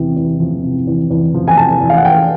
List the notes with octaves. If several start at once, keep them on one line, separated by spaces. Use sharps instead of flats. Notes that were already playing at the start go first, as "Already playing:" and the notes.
Already playing: E2 C3
E2
F3
C3
E2
E2
F3
G#5
C3 A5
E2
F5
F#5
E2 G5